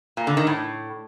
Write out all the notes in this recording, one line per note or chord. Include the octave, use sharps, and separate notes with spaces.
A#2
D3
D#3
A2